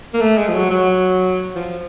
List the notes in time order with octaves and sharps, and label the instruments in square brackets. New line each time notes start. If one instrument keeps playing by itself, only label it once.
[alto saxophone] A#3
A3
G#3
F3
F#3
F#3
F3